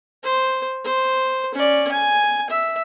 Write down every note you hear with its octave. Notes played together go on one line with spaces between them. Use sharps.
C5
C5
C#4 D5
G#5
E5